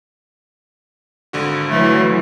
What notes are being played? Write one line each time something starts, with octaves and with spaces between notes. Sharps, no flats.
G#1 D3 F#4
E3 F#3 A3